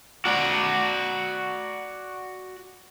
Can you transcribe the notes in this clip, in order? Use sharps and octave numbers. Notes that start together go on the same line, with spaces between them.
F#4 D5